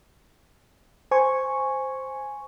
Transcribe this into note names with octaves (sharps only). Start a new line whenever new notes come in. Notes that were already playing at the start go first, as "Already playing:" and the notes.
C5 G#5 C#6